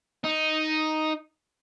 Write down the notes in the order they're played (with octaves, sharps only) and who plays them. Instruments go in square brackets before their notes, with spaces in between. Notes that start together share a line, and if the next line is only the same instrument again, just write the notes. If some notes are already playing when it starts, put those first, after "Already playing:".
[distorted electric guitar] D#4